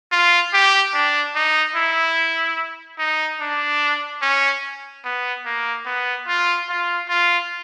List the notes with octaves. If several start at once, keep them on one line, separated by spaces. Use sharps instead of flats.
F4
G4
D4
D#4
E4
D#4
D4
C#4
B3
A#3
B3
F4
F4
F4